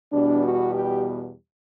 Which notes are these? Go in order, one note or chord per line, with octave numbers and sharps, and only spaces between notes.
E2 B2 G3 D4
F#4
G4